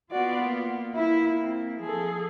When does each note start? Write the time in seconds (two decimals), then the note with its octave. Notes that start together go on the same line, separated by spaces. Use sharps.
0.11 B3 F4 F#4 D5
0.42 A#3
0.95 E4
1.40 C4
1.80 F3 G#4 A4